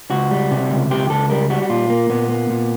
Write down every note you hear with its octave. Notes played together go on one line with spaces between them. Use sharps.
C#2 F#4
G3
C3
C#2
C#2 G4
C#2 A4
G3 A#4
G3 F#4
F#4
A#2 F4
A#3
A#2 B3
A#3
A#2